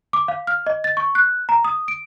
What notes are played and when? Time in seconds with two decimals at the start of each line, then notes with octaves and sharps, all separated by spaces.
0.13 D6
0.28 F5
0.47 F6
0.67 D#5
0.84 A6
0.97 C#6
1.15 F#6
1.49 A#5
1.65 D#6
1.88 D7